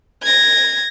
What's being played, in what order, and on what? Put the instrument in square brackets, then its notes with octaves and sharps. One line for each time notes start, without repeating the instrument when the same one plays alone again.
[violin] G#6 A#6